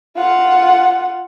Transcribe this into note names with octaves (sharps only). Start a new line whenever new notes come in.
F4 F#5